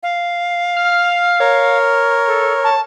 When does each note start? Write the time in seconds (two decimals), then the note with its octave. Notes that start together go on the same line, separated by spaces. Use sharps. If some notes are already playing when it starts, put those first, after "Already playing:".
0.03 F5
0.76 F6
1.40 A#4 C#5
2.27 A4
2.64 A5